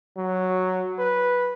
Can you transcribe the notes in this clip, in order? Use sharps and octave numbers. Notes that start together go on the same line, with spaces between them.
F#3
B4